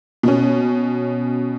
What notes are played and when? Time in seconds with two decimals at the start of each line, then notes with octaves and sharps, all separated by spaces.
0.23 B2 C#4